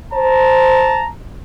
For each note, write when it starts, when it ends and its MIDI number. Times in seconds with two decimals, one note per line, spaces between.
0.14 1.04 72
0.14 1.10 81
0.14 1.10 82